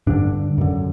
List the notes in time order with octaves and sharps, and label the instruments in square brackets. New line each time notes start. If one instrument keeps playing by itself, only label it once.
[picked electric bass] G2 D3 D4
F#2 D3